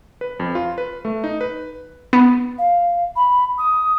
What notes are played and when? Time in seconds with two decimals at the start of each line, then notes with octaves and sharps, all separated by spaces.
0.21 B4
0.40 F2
0.55 F4
0.78 B4
1.05 A3
1.24 D#4
1.41 B4
2.13 B3
2.58 F5
3.16 B5
3.58 D#6